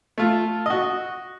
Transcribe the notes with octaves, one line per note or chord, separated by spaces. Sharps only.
A3 F4
F#4 D#5